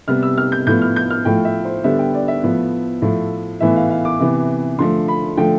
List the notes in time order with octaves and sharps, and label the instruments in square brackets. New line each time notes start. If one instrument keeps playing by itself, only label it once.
[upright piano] C3 G3 B3 F6
E6
F6
G6
A2 F3 B3 G6
F6
G6
F6
A2 F3 A3 G5
E5
C5
D3 G3 B3 E5
G5
D5
E5
A2 F3 B3
A2 F3 A3
A2 E3 B3 E5
F5
F5
D6
C3 E3 B3
D3 F3 A3 C6
B5
D3 F3 A3 G5